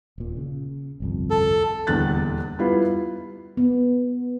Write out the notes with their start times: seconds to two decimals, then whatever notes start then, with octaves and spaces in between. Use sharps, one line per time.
0.18 D#1 A#2
0.37 C#3
1.00 G1 C2 F2
1.30 A4
1.87 D#1 E2 D3 F#6 A6
2.59 G3 B3 E4 F4
3.57 B3